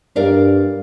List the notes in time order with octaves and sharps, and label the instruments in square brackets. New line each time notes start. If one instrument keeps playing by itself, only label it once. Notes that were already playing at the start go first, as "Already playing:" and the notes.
[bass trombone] G2 [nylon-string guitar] A#4 D5 F5